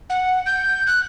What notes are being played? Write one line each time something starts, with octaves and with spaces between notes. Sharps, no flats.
F#5
G6
F#6